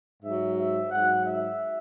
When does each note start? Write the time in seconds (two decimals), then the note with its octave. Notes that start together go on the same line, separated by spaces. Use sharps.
0.22 G#2 F#3 E5
0.57 E5
0.92 G#2 F#3 F#5
1.26 E5